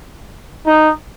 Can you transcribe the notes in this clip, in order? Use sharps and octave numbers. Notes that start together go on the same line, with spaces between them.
D#4